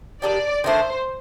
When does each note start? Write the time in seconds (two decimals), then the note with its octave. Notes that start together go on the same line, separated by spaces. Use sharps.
0.22 D#3 G3 D4 G4 D5
0.64 D#3 A3 D4 C5